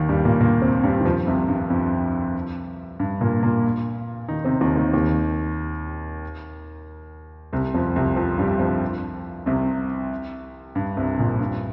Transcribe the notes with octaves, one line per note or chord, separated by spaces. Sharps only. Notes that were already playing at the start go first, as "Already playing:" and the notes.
Already playing: D#2 D#3
G2 G3
A#2 A#3
A#2 A#3
C3 C4
G2 G3
D#3
F2 F3
C2 C3
G2
F2
G2
A#2 A#3
A#2 A#3
D#3 D#4
C3 C4
D#2 D#3
D#2 D#3
D#2 D#3
C2 C3
F2 F3
C2 C3
F2 F3
G2 G3
F2 F3
C2 C3
G2
C2 C3
A#1 A#2
G2